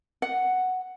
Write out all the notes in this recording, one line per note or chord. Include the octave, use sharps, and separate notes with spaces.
F#5